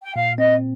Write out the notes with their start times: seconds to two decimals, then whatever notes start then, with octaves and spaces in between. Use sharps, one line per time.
0.04 G5
0.16 A#2 F5
0.38 C4 D#5